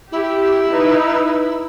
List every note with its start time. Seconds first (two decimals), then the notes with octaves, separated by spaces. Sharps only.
0.11 E4 G4
0.71 D#4 B4